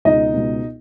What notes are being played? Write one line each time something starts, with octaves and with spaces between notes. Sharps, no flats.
C#2 B2 D#4 D#5
C#2 B2